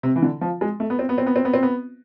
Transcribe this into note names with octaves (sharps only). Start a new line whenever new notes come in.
C3
E3
D3
F3
G#3
A3
B3
C4
B3
C4
B3
C4
B3
C4
B3